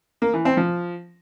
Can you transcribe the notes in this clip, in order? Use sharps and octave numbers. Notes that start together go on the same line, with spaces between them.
A#3
E3
C4
F3